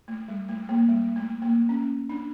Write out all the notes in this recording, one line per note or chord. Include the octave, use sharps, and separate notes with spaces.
A3
G3
A3
A#3
G3
A3
A#3
C#4
D4